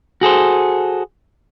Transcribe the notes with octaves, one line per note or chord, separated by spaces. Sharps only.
F#4 G#4 A4 C5